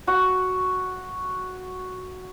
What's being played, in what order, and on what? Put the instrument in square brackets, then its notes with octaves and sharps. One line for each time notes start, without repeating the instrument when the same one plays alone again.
[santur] F#4 C#6